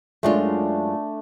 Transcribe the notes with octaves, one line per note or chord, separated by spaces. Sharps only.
F#2 G#3 A3 D4 F4